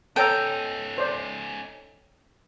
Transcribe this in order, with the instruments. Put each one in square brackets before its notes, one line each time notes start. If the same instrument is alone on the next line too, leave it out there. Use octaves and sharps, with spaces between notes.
[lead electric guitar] C#4 D#4 [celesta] A4 C#5 E6 [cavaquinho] G5 [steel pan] A5 A#5
[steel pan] C5 D5